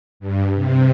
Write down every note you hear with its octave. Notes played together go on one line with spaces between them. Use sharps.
G2
C3